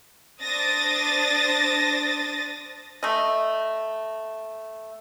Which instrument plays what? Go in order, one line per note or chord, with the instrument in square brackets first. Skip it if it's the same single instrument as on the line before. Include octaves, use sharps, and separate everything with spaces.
[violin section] D4 C5 D#6 A6 A#6
[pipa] A3 D#5